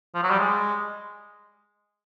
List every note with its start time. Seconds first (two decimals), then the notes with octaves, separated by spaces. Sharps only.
0.15 F3
0.23 F#3
0.30 G3
0.39 G#3